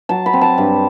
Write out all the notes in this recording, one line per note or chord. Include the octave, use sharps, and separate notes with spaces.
F#3 A5
B5
C4
A5
G2